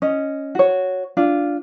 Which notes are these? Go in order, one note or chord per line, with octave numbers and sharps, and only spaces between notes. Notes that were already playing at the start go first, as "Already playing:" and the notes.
C#4 D#5
F#4 C#5
D4 F4